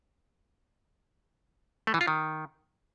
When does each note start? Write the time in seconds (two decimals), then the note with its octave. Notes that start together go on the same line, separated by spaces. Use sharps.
1.87 A3
1.94 E3
2.01 F4
2.08 D#3